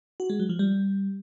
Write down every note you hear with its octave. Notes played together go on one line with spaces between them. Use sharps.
F#4
G#3
F#3
F3
G3